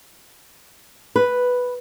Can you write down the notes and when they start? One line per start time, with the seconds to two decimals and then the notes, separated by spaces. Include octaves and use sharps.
1.16 B4